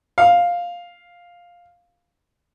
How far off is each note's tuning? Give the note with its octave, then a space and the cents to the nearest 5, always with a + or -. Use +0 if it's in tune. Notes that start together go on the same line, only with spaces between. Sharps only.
F5 +5